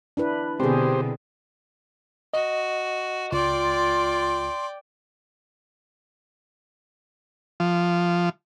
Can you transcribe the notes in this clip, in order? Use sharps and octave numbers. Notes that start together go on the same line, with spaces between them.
D4 E4 B4
B2 D3 C4 G4 G#4 C5
F#4 D#5
C#2 F4 D5 G5 C6
F3